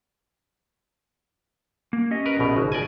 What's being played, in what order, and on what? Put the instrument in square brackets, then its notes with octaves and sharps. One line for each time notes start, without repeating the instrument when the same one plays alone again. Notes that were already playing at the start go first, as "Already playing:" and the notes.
[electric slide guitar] A#3
C#4 G4 D#5
[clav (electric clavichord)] A#4 B4
A#1 B2
[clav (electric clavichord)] G#1 [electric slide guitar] C#3
[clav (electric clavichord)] D5 D#5 G#5